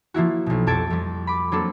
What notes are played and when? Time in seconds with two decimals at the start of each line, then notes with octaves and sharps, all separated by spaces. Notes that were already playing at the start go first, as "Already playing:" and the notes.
0.14 F3 A#3 E4 F#4
0.46 B1 B2
0.67 F2 G4 A4 A5 G#6 D7
0.90 F2 G3
1.27 B5 D6
1.52 F#3 A#3 C4 D4 A4